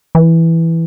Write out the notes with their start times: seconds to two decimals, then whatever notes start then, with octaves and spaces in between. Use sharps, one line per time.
0.15 E3